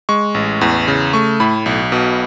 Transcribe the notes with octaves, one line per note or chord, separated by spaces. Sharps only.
G#3 C#6
A1
E2
C#3
A3 C#6
A2 B5
B1
B2